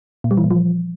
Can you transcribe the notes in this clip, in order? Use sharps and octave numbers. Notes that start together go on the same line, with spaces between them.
A#2
G3
E3
A#2
F3